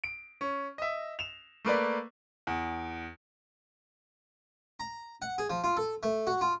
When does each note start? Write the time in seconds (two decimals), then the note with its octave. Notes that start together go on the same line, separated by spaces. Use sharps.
0.04 D7
0.41 C#4
0.78 D#5 E5
1.19 E7 F7
1.65 A3 A#3 B4 D5
2.47 E2
4.80 A#5
5.22 F#5
5.38 G#4
5.50 F3
5.64 F4
5.77 A4
6.03 A3
6.27 F#4
6.41 F4